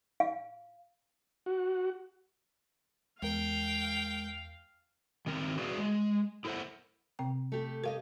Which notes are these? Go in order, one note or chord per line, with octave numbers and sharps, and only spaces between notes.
F5
F#4
E2 G#3 A#4 F5 G5
D#3 C4 A#4
F#4 G#4 B4 D5 E5 F5
G#3
E4 A4 A#4 C5 E5 F#5
C3 C4 G5
A3 G4
G4 A#4 D5 D#5 F5